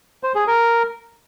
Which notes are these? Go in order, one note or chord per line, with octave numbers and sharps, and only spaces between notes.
C5
G#4
A#4